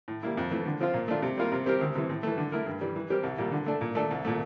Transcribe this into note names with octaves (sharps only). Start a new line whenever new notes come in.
A2
G3 A#3 E4
F2
E3 A3
D3
F3 C4 F4
A#2
A3 D4 F4
C3
G3 A#3 F4 A#4
C3
G3 C4 G4 A#4
D2
C3 E3
A2
E3 A3
D3
A3 E4 A#4
G2
E3 G3
E3
G3 C4 G4 A#4
C2
A#2 G3
D3
A3 D4 A4
A#2
A3 D4 A4
C2
A#2 A3